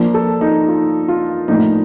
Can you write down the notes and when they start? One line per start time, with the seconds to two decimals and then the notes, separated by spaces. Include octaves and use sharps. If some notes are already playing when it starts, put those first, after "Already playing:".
Already playing: F3 A#3 D4
0.14 A4
0.41 D#4
0.68 F4
1.08 F4
1.48 A2 F3 A#3 D4 D#4